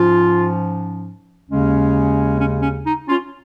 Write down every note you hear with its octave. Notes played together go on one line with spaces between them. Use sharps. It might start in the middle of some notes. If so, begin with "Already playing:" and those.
Already playing: G#2 F3 C#4 F4
D#2 C#3 G#3 C#4
C#4
C#4
D#4
C#4 F4